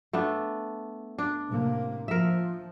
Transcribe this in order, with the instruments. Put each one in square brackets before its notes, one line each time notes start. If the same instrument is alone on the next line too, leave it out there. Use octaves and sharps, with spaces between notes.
[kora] A3 B3 D4
D4
[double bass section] A2 C3 A#3
[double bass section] F3 [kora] A#4 E5